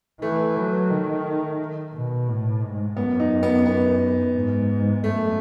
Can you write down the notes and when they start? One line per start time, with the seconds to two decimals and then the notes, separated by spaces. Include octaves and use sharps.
0.21 E3 A3
0.56 F#3
0.90 D#3
1.94 B2
2.28 A2
2.63 G#2
2.97 F#2 B3
3.20 D#4
3.43 B3
3.66 B3
4.35 G#2
5.04 F#2 A3